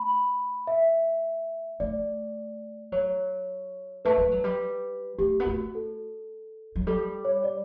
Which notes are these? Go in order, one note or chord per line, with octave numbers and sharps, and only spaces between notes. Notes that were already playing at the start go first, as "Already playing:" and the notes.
Already playing: A3 B5
E5
A3 D5
F#3 C#5
A3 B4
G3
F#3
G3
A3 G4
B3
A3 F#4
A4
F#3
G3 A4
C#5
D5